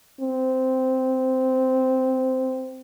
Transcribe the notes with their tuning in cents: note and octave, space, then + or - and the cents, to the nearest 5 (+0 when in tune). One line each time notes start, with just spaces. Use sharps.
C4 -10